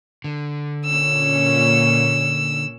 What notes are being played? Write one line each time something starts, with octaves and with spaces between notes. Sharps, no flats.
D3
A#2 C#4 E6